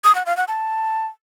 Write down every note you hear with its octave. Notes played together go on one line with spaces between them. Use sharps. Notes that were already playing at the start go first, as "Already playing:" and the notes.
D#6
F#5
F5
F#5
A5